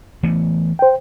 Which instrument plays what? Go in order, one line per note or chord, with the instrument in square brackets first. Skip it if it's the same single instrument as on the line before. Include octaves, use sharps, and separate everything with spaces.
[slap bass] E3 A3 B3
[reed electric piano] C5 G5